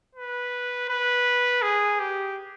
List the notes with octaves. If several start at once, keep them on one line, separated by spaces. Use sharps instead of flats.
B4
B4
G#4
G4